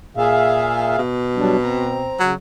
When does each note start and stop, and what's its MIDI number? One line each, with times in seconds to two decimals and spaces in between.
0.17 0.95 46
0.17 1.00 68
0.17 1.00 76
0.17 1.00 77
0.98 2.12 47
1.36 1.56 54
1.36 1.56 55
1.36 1.56 62
1.62 2.19 60
1.62 2.19 82
2.20 2.34 49
2.20 2.33 54